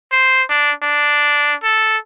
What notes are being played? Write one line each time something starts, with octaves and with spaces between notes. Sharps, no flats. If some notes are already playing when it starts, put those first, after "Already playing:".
C5
D4
D4
A4